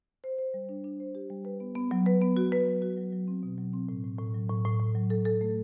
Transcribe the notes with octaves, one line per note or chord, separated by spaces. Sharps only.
C5
C5
G3
D4
D4
C5
G4
G3
B4
B3
B3
F#3
B4
B3
F#4
B4
F#3
F#4
F#3
F#3
C4
B2
F#3
C4
A2
A2
A2
F#3
A2
A2
A2
F#3
A4
A4
A3